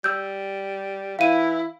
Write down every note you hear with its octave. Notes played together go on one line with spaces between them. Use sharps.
G3 E6 G6
E3 E4 F5 D#7